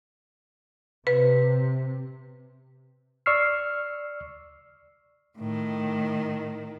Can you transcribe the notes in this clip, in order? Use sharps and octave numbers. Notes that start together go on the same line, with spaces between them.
C3 B4
D5 C#6 E6 F6 C7
A2 D#3